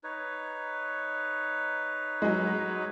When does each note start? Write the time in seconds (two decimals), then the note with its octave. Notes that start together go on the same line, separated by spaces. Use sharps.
0.04 D#4 B4 C#5
2.22 F#3 G#3